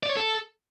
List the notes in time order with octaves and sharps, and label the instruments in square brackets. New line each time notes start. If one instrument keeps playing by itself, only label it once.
[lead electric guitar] D5
C#5
A4